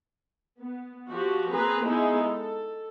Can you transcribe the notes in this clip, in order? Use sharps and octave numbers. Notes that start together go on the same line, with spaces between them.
B3
F3 F#4 G4
A#3 C4 G#4 B4 A#5
G#3 B3 D#4 E4 G#4
A4